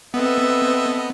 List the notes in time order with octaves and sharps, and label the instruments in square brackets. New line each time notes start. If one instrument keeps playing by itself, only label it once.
[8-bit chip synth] B3 [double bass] C4 [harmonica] A4 D#5 E5 [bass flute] B4